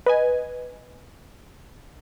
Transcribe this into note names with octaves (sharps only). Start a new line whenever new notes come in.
B4 D#5 G#5